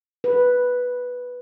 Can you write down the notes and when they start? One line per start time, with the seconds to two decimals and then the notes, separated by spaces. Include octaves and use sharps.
0.24 B4